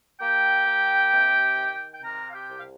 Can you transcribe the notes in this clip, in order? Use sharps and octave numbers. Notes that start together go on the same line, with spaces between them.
A#3 G4 G5
A#3
C3
D#3
G5
C3 A#4 A#5
F5
G4 G5
C2
F5